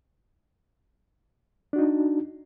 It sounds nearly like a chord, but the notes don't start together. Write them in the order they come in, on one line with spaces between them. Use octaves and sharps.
D4 F#4 D#4